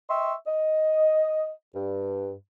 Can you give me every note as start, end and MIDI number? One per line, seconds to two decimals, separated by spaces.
0.08 0.33 75
0.08 0.33 76
0.08 0.33 79
0.08 0.33 84
0.08 0.33 85
0.08 0.33 88
0.47 1.50 75
1.74 2.33 43